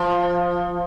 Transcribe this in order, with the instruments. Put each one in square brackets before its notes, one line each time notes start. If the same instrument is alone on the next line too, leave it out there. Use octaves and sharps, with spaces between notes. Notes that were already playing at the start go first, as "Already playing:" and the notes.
Already playing: [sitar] F3